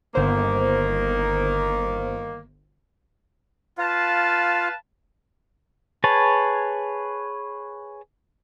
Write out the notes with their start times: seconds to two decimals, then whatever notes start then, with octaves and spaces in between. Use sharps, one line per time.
0.15 G1 D#3 A#3 C5
3.78 F4 B4 F5 A5
6.04 G#4 B4 C#5 A5